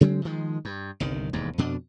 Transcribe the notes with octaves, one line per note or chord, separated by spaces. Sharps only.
C#3 F#3 G#3 C4
D#3 F3 G#3
G2
G1 C2 D#3
E1 D#2 G#2
F2 B2 D4